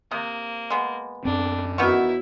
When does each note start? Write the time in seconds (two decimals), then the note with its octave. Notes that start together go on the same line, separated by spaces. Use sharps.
0.11 C3 A#3 D#6
0.70 G#3 B3
1.25 F#2 C4 D4
1.78 E2 D#3 F#3 B3 E4 E5 C#6